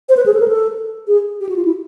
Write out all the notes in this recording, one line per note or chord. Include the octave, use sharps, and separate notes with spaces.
C5
B4
G#4
A4
A#4
A4
G#4
G4
F#4
F4
E4